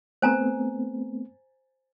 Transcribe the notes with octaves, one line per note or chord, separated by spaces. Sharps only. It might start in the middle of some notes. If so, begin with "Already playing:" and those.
A3 B3 C4 C5 G#5 A#5